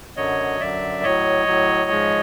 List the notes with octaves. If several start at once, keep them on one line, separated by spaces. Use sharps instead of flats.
F#2 D3 F#3 C#5 D#5
F#2 D3 F#3 D5 E5
A2 F#3 C#5 D#5
A2 F#3
G#2 F3 G#3